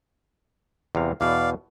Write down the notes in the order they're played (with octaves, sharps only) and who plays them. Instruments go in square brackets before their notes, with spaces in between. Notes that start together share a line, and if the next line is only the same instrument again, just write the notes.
[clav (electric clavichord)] E2 C3 F5
[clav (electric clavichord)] E2 B2 [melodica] D5 F5